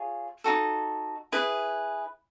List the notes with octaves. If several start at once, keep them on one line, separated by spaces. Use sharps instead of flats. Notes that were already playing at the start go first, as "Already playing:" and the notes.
Already playing: F4 G#4 C#5
D#4 F#4 A4
E4 G#4 B4